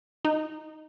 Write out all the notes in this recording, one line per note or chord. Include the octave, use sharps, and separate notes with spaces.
D#4